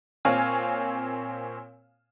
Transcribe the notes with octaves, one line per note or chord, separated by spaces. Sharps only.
A#2 C4 C#5 F5 G#5 F6